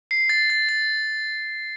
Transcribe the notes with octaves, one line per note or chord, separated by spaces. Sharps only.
C7
A6
A6
A6